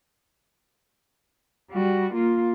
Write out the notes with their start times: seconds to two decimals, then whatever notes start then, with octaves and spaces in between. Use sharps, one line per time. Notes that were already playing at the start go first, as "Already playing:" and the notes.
1.71 G3 F#4
2.14 A#3 F4